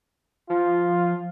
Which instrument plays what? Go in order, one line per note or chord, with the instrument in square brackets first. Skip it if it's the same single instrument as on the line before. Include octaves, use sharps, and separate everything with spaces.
[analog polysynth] F3 [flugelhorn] F4